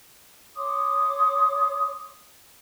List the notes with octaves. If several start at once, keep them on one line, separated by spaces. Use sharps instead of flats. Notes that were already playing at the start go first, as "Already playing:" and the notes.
C#5 C6 D6 D#6